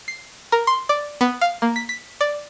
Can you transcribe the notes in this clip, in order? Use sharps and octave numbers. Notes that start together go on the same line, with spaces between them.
C7
A#4
C6
D5
B3
F5
A#3
B6
B6
D5